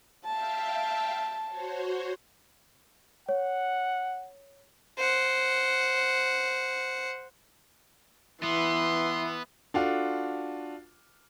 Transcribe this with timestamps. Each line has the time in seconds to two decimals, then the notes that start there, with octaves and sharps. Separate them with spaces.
0.25 E5 F5 G5 A5
1.46 F#4 C5 C#5
3.29 C#5 F#5
4.97 C5 F#5
8.44 E3 B3 C6
9.74 D4 F4 F#4 A4